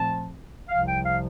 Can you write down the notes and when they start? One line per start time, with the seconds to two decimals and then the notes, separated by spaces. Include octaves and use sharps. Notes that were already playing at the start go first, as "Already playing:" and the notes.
Already playing: A#2 F3 A3 C4 A5
0.68 C2 C3 F3 F5
0.86 G5
1.04 F5